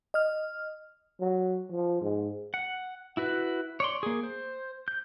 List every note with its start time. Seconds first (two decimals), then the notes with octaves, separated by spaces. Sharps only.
0.14 D#5 F6
1.21 F#3
1.71 F3
2.01 G#2
2.54 F#5
3.17 E4 F#4 B4
3.80 C#5 D5 C6
4.03 A#3 G#4
4.23 C5
4.88 G6